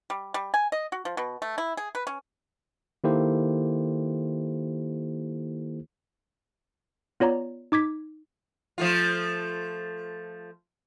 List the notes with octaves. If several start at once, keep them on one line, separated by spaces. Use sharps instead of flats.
G3
G3
G#5
D#5
F#4
F3
B2
A3
E4
G#4
B4
C#4
D#3 A#3 E4 G4 A4 C5
B3 F4 C#5 D5 A#5
D#4 D6 G#6 B6
F3 A3 F4